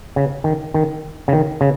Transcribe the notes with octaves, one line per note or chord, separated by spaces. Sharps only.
C#3
D#3
D#3
C#3
D#3
C#3